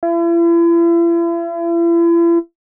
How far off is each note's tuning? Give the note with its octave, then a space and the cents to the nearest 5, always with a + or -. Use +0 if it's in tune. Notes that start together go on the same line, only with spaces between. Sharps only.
E4 +40